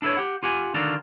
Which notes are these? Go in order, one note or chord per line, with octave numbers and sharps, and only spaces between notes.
D4 E4 A4 B4 C#5
G4 F#5
F4 G4 F#5 G#5
D3 D#3 D4 F4 F#4 A4